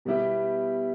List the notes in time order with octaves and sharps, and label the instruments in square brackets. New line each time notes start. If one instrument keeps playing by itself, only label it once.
[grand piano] B2 G3 B3 E4 G4